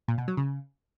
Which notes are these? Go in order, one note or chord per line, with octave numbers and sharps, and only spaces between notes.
A#2
B2
F#3
C#3